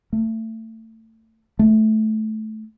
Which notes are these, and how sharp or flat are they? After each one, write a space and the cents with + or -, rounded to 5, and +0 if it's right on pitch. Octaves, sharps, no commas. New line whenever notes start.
A3 +25
A3 -15